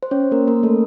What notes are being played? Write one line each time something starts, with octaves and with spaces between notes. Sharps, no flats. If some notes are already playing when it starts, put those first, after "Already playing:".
C5
C#4 C#5
A#3 A#4
A#3 A#4
A3 A4